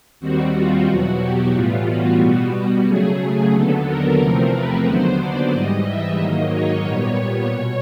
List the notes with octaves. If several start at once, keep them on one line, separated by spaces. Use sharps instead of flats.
D#2 D#3 G3 C4 F#4
F4
E2 B2 F#3 F#4
G4
A2 E3 G3 B3 F4
F#4
B2 G3 B3
C#3 F#3 A3 G#4
D#2 D3 F#3 B3 A4
A#4
E2 C3 F3 A3 C4
B4
D#2 D3 F#3 B3 C5
D5
G#2 E3 G3 D#5
E5
G#2 D#3 F#3 A#3 D#5
C#5
A#2 G3 B3 C#5
B2